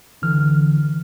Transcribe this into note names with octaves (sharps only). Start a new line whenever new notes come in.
C2 D3 E3 F6